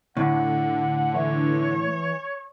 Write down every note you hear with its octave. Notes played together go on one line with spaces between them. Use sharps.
A2 D3 F#5
E3 C#5